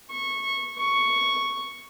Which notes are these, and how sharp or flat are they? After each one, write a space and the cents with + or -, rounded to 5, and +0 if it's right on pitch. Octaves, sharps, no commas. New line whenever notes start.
C#6 -15
C#6 +0